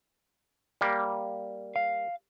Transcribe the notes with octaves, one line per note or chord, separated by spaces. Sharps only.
G3 A#3
F5